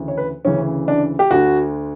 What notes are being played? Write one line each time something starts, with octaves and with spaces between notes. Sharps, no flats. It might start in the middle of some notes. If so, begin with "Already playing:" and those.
Already playing: D2 C#3 E3
C#5
B4
D2 C#3 E3 C#4
D4
G4
D2 D3 F#4